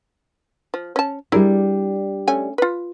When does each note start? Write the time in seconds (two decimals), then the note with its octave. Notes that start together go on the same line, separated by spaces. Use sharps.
0.74 F3
0.96 C#4 A5
1.32 G3 D4 E4 G#4 A#4
2.27 A3 C#4 G#5
2.58 F4 B4